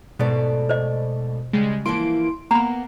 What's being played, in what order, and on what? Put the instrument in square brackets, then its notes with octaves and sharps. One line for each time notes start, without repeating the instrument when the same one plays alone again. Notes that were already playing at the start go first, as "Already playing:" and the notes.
[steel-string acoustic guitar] G#2 A3 D5 [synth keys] B2
[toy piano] C5 D#5
[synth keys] C#3 G3 G#3
[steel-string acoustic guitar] E3 F3 A#3 [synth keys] E4 C6 D7
[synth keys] A#3 [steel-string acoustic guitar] B3 [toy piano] A#5 B5